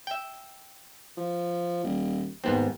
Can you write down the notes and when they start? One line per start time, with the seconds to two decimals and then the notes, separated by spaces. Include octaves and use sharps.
0.07 E5 G5
1.17 F3
1.84 D#1
2.44 D#2 G#2 B3 C4